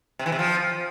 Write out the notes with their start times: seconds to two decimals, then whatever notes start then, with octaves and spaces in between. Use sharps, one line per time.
0.19 C3
0.26 E3
0.32 C3
0.39 F3